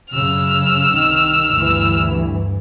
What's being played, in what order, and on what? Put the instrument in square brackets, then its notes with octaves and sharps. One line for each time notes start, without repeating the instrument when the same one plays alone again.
[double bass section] F#2 C#3 [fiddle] E6 F6
[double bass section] C2 D#3
D2 G2 E3